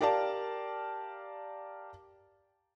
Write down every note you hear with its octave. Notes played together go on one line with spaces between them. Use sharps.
G4 A#4 D5 F5 A5